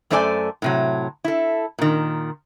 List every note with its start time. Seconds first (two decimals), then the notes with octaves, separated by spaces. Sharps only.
0.10 F#2 A3 A4 C5 D5 G#5
0.62 A2 C3 F#3
1.24 E4 A4
1.79 A#2 D#3